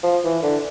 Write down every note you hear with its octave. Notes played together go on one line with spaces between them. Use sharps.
F3
E3
D3